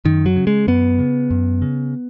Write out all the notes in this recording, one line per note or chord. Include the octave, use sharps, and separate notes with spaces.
F#2 D#3
F#3
C#3
G#3
F#2 B3
C#3
F#2
C#3